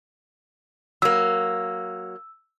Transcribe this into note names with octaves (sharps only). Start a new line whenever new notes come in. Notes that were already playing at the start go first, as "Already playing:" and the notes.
F#3 A#3 E6